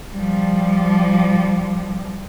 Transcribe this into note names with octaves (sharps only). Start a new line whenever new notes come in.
F3 G3